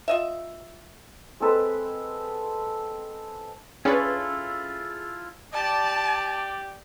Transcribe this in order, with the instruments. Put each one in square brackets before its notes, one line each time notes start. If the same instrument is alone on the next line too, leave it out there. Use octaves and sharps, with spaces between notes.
[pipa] F4 D#5 E5
[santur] G#3 C4 A4 B4
[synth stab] C#4 D4 B4 [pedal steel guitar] E4 F4 A4 [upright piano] G#4
[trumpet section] G4 D5 [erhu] A5